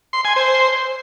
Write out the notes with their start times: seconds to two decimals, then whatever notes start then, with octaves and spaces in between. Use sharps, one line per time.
0.13 C6
0.25 G#5
0.36 C5